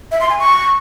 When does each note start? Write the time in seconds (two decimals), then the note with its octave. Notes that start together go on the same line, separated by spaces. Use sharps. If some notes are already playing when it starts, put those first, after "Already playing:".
0.11 E5
0.21 C6
0.30 G#5
0.39 C#6